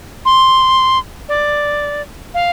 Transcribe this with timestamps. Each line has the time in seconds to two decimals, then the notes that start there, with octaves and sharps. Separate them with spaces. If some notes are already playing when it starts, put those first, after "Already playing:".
0.25 C6
1.29 D5
2.34 F5